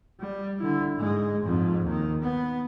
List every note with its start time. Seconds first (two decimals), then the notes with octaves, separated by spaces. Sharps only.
0.20 G3
0.59 D3 E4
0.96 G#2 G#3
1.44 F2 G#2
1.85 D#2 D#3
2.22 B3